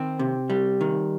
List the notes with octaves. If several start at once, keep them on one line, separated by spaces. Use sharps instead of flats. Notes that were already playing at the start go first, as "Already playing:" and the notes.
Already playing: D#3 C4
C3
G3
D#3